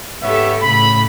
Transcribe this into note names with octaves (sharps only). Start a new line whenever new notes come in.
G#2 B3 G4 A4 C#5 E5
A2 C#3 B5